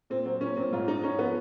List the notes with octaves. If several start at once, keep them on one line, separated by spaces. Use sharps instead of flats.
A#2 C4
F#3 C4
A#2 C#4
A#2 C4
G#2 F4
G#2 D#4
G#2 C#4
F3 B3